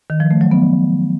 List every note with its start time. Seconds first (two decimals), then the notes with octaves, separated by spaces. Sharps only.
0.10 D#3
0.20 F3
0.31 A3
0.41 F#3
0.51 B3